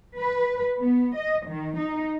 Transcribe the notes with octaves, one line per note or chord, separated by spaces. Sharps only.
B4
B3
D#5
D#3
D#4